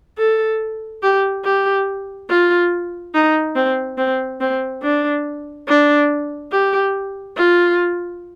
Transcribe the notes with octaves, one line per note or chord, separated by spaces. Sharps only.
A4
G4
G4
F4
D#4
C4
C4
C4
D4
D4
G4
F4